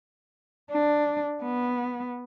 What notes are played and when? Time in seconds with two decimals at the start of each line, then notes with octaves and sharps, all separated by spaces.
0.71 D4
1.43 B3